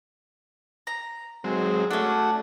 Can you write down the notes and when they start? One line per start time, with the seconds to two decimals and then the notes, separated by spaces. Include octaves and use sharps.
0.87 A#5
1.44 B1 G#2 F#3 G#3 C4 G#4
1.91 A3 C#4 D4 F#4 F#5